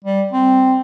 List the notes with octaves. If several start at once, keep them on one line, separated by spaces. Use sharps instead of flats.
G3
C4